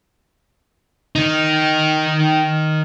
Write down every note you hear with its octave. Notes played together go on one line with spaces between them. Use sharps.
D#3 D#4